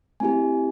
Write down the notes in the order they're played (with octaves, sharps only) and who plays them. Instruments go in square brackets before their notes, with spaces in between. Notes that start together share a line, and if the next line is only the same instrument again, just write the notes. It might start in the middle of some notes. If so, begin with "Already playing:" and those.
[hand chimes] A3 C4 E4 G4 G#5